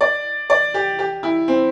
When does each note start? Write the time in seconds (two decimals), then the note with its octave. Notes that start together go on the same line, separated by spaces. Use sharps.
0.01 D5
0.50 D5
0.74 G4
0.99 G4
1.23 E4
1.48 C4